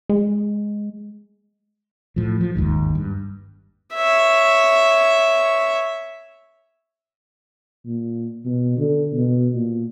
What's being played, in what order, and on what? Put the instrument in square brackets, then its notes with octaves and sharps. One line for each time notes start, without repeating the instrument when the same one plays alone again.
[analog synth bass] G#3
[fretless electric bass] A2 F3
F3
G1 D#2 G#2 D#3
G2
[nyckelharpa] C#5 E5
[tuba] A#2
B2
D3
B2
A#2